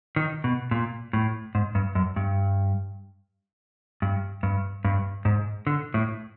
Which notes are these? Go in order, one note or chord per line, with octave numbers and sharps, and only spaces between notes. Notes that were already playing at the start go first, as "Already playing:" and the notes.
D#3
B2
A#2
A2
G#2
G2
F#2
G2
G2
G2
G2
G#2
D3
A2